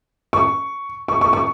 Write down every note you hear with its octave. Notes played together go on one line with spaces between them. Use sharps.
C#6
C#6
C#6
C#6